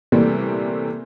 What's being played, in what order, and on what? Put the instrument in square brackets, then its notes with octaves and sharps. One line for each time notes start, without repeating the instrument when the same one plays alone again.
[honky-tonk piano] C3 E3 G3 A3 A#3 C4